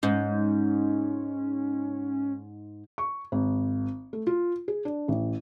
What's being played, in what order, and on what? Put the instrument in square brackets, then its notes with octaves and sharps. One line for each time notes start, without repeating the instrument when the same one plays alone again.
[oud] G#2 [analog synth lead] C#4
[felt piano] C#6
G#1
A3
F4
G#4
D4
A1